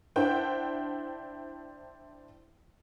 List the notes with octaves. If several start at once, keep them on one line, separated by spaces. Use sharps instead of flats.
D4 E4 C5 F#5 G5